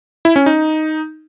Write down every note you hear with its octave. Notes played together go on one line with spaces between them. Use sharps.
E4
C#4
D#4